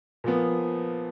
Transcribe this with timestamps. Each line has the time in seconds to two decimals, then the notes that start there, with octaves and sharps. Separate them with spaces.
0.24 A#2 F3 B3